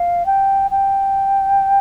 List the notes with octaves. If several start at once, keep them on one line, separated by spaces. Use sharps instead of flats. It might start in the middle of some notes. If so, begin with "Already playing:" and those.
Already playing: F5
G5
G5